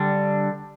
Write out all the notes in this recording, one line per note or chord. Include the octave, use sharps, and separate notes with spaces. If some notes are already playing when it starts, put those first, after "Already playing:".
Already playing: D3 G3 D4